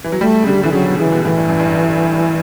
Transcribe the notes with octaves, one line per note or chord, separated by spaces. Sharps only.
E3
F#3
G3 A3
C#3
D3 G3
D3 E3
C#3 F#3
B2
C#3 E3
B2
A2 E3
G2
F#2
G2